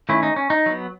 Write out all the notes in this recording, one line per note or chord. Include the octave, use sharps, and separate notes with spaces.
D#3 A3 C#4 E4
D#4
C#4
D#4
F#3 B3